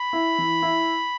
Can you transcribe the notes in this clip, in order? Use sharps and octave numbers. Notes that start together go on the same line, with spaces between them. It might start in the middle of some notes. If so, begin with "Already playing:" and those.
Already playing: B5
E4
E3
E4